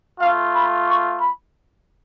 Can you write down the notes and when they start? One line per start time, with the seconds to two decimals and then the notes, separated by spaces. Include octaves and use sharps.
0.20 A3 F4 F5
0.53 B5
0.87 C#6
1.20 B5